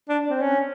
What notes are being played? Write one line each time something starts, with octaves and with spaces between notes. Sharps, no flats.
D4
C4
C#4